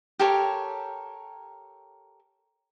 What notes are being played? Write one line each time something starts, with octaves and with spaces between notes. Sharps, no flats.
G4 A4 A#4 C#5